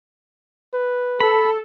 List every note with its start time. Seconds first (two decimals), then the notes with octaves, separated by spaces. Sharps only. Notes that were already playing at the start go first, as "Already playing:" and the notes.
0.74 B4
1.20 A4 B5